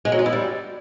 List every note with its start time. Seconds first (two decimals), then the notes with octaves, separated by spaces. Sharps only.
0.05 G#3
0.12 F#3
0.19 G#3
0.26 E4
0.33 G3